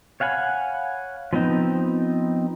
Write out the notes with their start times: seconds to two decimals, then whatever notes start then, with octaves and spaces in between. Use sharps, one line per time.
0.20 C#5 F5 F#5 G#5 B5
1.33 F3 B3 C4 D#4